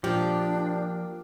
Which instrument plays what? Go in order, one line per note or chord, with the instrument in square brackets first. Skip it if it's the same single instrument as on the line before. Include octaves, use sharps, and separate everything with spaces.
[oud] A#2 [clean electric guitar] F3 [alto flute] D4 [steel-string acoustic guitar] G4